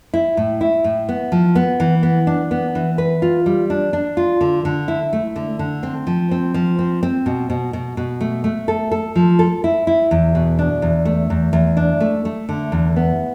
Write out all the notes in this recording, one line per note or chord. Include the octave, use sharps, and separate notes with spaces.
E4
A2
E4
A2
B3
F3
B3
E3
B3
D4
B3
E3
B4
F4
G3
D4
D4
F4
D3
D3
E4
A3
D3
D3
C4
F3
C4
F3
C4
C4
B2
B2
B2
B2
A3
A3
A4
A4
F3
A4
E4
E4
E2
B2
D4
E2
A3
E2
E2
D4
A3
A3
D3
E2
B3